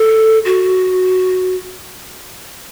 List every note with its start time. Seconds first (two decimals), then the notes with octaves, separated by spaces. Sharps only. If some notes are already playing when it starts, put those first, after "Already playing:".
Already playing: A4
0.45 F#4